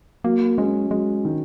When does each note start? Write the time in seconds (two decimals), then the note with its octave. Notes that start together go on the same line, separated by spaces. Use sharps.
0.24 F#3 A#3
0.58 G#3 C#4
0.91 F#3 G#3
1.25 D#3